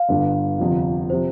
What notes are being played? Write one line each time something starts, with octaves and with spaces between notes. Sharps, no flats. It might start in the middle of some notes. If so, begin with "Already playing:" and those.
Already playing: F5
G1 G2 D3
G1 F2 C3 F3
C3 F3 C5